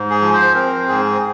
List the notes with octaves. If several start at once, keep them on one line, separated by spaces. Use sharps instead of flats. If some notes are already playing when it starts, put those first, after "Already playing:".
Already playing: G#2
G#4
F3
C5
C4 A#4
G#2 G#4